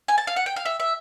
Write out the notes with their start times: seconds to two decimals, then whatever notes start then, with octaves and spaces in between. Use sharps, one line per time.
0.08 G#5
0.18 A5
0.27 F5
0.36 F#5
0.46 G5
0.56 F5
0.65 E5
0.80 E5